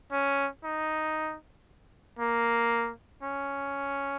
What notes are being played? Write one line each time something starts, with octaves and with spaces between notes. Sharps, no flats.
C#4
D#4
A#3
C#4